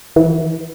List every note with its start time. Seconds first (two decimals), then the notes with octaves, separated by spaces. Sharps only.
0.16 E3